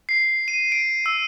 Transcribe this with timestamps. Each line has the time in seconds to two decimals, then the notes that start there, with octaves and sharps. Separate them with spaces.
0.09 C7
0.48 D#7
0.72 D7
1.06 E6